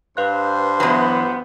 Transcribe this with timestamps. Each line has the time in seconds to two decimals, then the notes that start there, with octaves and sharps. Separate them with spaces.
0.17 G2 B4 C5 F5 F#6
0.80 E2 F#3 B3